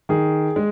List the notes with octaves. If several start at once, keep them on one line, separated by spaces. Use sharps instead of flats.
D#3 G#4
G#3